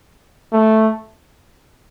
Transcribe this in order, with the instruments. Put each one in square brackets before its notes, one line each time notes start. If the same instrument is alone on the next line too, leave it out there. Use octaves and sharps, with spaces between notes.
[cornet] A3